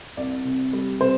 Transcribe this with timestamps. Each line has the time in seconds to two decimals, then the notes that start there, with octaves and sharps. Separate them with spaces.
0.17 C2 D5
0.45 C3
0.73 G3
1.01 C3 C5